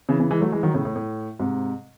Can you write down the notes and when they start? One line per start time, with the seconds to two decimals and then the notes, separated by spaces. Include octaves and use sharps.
0.09 C#3 E3
0.20 C#3 E3
0.31 E3 G#3
0.41 F#3 A3
0.52 E3 G#3
0.63 D#3 F#3
0.74 A2 C#3
0.85 A2
0.96 A2
1.39 G#2 C3